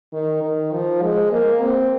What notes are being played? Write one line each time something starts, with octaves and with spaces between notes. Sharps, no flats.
D#3
D#3
F3
G#3
A#3
C4